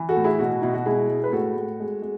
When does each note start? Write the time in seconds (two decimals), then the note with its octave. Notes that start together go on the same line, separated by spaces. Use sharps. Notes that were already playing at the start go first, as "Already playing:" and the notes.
Already playing: E3
0.09 F#4 A4
0.17 A2
0.24 E4 G#4
0.39 B2 F#4
0.62 B2 E4
0.74 F#4
0.86 G#3 E4 G#4
1.09 G#3
1.24 B4
1.32 A2 F#4 A4
1.56 A2
1.80 G#3
2.02 G#3